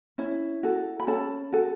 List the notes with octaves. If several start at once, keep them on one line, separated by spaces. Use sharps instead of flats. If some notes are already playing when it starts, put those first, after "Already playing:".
C#4 E4 E5
F#4 A4
B5
C#4 A4 A5
F#4 A4